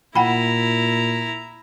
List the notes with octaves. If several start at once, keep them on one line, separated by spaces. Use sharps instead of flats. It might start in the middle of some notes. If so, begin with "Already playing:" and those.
A#2 E4 F#5 G5 A#5 B5